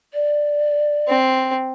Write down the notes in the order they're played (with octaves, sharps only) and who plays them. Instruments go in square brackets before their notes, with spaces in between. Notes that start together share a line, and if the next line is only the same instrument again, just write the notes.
[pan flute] D5
[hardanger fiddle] C4